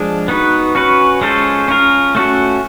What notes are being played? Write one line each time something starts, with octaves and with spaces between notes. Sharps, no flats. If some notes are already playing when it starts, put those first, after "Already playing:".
Already playing: F3 G#3 D4
B3 D#4 F#4 B4
C#4 F#4 B4
G#3 C#4 F4 A4 C5
C#4 F4 A#4
A3 C#4 F#4 A4